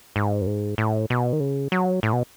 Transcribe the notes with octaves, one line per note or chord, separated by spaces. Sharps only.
G#2
F#2
G#2
A2
B2
D#3
C#3
F#3
A2
B2